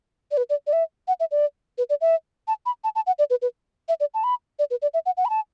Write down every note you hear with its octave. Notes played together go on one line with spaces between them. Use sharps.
D5
B4
D5
D5
E5
F#5
E5
D5
B4
D5
E5
A5
B5
A5
A5
F#5
D5
B4
B4
E5
D5
A5
B5
D5
B4
D5
E5
F#5
F#5
B5
A5